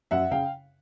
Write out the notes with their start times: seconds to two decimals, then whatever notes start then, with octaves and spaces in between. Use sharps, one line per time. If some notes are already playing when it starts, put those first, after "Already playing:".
0.11 F#2 E5 F#5
0.31 C#3 F5 G5